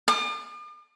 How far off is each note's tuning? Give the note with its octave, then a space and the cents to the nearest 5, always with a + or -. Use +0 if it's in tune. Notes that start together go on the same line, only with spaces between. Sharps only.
D6 +45